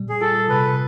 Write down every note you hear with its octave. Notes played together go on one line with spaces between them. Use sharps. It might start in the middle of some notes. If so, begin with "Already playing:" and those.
Already playing: A#2 G3
G#4
F4 A4
C3 B4